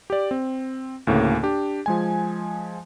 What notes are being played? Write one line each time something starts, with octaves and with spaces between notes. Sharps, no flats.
G4 D5
C4
D2 A2 C#3 A#3
D4 G4
F3 G#3 G#5